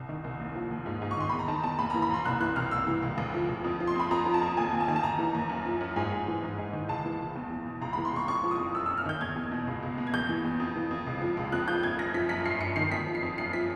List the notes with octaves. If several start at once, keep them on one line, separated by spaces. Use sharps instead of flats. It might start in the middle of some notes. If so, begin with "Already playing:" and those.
Already playing: C2
D#3
C2
D#2
F3
D#2
G#2
G#2
C#6
D#3 C6
E2 B5
A#5
D#3 A5
E2 A5
D#2 B5
E3 A#5
B5
D#2 C6
C2 F#6
E3 F#6
C2 F6
C#2 E6
E3
C#2
D2
F3
D2
F2
F3
C6
F2 B5
F2 A#5
F3
A5
F2
D#2 G#5
D#2
A5
D#3 G#5
A5
D#2 A#5
E3
D#2
F#2
F3
F#2
G#2 G#5
G#2
E3
G#2
G#2
D#3
C#2 A5
E3
C#2
E2
E2
B2
C#2 A#5
E3 B5
C6
C#2 C#6
F2 C#6
F3
D#6
F2
F#2 E6
F#2 E6
F6
D#3 G6
E2 G#6
E2
B2
C#2
C#2
B2
G#6
E2 G6
E3
E2
F2
E3
F2
C#2
F3
C#2
F2 F#6
F3 G6
F2 G#6
F#2 A#6
F3 B6
F#2 B6
G2 C7
G2 C#7
D#3 C7
F2 B6
F3
C7
F2
F#2 C7
F3 B6